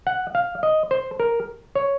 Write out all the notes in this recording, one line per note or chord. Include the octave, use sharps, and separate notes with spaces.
F#5
F5
D#5
C5
A#4
C#5